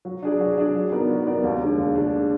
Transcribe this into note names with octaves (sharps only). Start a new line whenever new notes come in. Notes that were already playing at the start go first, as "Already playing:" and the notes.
F#3
D4 G#4 D5
F#3
D4 G#4 D5
F#3
B3 D#4 A#4 D5
F#3
B3 D#4 A#4 D5
D#2
D3 G#3 D4
D#2
D3 G#3 D4